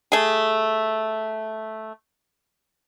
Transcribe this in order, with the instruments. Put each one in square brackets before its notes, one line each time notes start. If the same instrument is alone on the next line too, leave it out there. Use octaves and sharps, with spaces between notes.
[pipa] A3 G#4